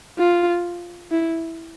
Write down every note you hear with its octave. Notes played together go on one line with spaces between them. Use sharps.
F4
E4